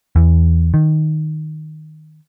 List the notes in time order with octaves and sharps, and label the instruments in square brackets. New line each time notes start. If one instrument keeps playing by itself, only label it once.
[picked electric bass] E2
D#3